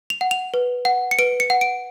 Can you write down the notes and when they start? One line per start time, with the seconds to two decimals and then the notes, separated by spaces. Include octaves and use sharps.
0.10 F7
0.21 F#5
0.31 F7
0.54 B4
0.85 F#5
1.11 C#7
1.19 B4 D7
1.40 C#7
1.50 F#5
1.61 D7